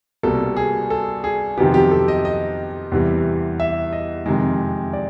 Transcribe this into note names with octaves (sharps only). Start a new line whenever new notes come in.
C2 B2 G3 A#3 A4
G#4
A4
G#4
F2 C3 D#3 F#3 B3 G4
G4
A4
D#5
D#5
E2 C3 E3 G3
E5
D#5
F2 C3 D#3 G#3
D5